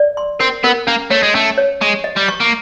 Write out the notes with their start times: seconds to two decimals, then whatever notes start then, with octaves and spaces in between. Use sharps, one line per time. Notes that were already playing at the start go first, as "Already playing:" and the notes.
Already playing: D5
0.17 C6
0.40 C4 A#4
0.64 B3 A#4
0.87 A#3 C#4
1.11 A3 C#5
1.23 G#3
1.34 A3 C#4
1.58 C#5
1.81 G#3 C#6
2.04 D#5
2.16 G3
2.29 C#6
2.40 A#3